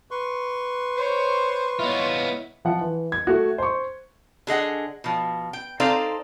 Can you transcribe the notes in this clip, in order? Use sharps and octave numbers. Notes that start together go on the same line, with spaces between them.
B4 C6 C#6
C5 C#5
B3 E4 F4 C#5 D#5
F3 F4 F#5
E3
G#6
A3 F#4
C5 C#6
D3 G#4 D#5 F#5
B2 F3
G5
C4 D#4 A4 C5 D5 F5